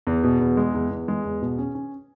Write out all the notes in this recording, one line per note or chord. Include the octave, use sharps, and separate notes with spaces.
E2
B2
E2
G#3
E2
E2
G#3
E2
B2
C#4
C#4